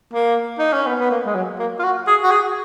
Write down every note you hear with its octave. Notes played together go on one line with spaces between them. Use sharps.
A#3
D#4
C#4
B3
B3
A#3
G#3
F#3
A#3
F4
F#4
G#4
F#4
G#4